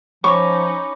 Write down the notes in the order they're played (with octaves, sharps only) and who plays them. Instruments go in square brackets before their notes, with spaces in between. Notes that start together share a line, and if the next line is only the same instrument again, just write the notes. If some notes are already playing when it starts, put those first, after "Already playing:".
[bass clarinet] F3 [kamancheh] C#4 D#4 [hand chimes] C#5 B5 D6 [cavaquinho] C#6